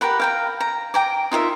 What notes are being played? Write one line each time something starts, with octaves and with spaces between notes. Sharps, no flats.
G4 A#4 B4 F#5
F5 G5 A#5
A#5
G5 A#5 D6
D#4 F4 A#4 E5